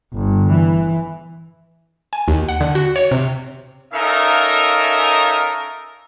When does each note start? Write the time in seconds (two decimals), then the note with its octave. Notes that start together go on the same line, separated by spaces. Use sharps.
0.13 G1
0.50 E3
2.13 G#5
2.28 D#2
2.49 F#5
2.61 D3
2.75 F#4
2.96 C#5
3.11 C3
3.93 C#4 D#4 A4 A#4 E5 F5